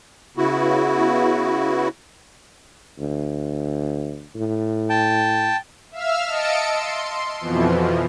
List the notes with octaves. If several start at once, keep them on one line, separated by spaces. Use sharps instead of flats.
C#3 B3 E4 F#4
D2
A2
G5 A5
E5 F5 E6 F6
D#5 A5 E6 C#7 D7
C6
F2 B2 E3 F3